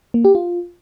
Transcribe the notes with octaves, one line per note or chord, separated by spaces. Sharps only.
A#3
G4
F4